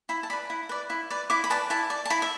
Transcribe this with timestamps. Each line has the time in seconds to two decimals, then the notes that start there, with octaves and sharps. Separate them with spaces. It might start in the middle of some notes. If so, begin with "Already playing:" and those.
0.09 E4 B5
0.23 A5
0.30 B4 D5 B5
0.50 E4
0.69 B4 D5
0.90 E4
1.10 B4 D5
1.30 E4 D6
1.44 B5
1.50 B4 D5 A5
1.70 E4 A5
1.90 D5
2.05 A5
2.10 E4 B5
2.22 E5